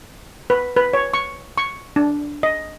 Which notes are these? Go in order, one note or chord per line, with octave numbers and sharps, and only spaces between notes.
B4
B4
C#5
C#6
C#6
D4
D#5